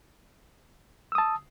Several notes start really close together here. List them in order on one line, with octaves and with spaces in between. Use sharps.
E6 D#6 A5